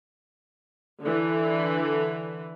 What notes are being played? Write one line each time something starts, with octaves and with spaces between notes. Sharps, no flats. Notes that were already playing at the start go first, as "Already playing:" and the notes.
D3 E3